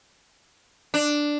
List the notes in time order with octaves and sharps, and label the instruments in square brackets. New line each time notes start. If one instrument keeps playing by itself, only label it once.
[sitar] D4